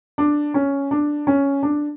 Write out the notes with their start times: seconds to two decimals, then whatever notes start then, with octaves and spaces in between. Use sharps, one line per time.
0.18 D4
0.54 C#4
0.91 D4
1.27 C#4
1.63 D4